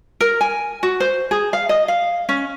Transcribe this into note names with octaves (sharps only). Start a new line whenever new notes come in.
A#4
G#5
F#4
C5
G#4
F5
D#5
F5
C#4